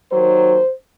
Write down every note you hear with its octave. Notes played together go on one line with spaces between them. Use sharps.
D#2 D#3 F#3 C5